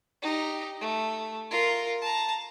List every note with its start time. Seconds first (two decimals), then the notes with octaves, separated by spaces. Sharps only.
0.22 D#4 G4
0.81 A3
1.50 F4 A#4
2.01 A5 A#5